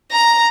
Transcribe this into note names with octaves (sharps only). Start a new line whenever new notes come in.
A#5